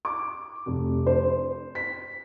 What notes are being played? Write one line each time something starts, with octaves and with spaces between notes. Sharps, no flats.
D6
F1
C5
B6